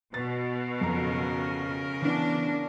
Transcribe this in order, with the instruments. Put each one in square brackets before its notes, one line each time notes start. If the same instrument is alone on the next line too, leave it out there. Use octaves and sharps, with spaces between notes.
[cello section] B2 [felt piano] A6
[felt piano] F2 A#5 [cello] C#3 A#4
[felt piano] E3 B3 [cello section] D4